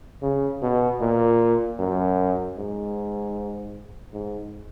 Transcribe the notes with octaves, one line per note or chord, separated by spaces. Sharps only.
C#3
B2
A#2
F#2
G#2
G#2